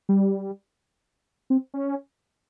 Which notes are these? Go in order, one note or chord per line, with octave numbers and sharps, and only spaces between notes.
G3
C4
C#4